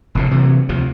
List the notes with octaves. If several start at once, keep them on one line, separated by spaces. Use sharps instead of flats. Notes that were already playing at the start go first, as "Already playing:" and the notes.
F1 A2 D3
C3 E3 F#3
D2 C3 F3